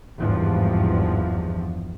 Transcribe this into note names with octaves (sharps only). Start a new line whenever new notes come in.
G#1 E2 G2 F3